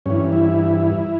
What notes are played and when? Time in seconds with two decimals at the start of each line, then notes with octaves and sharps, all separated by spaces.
0.06 G2 E3 C#4
0.32 E4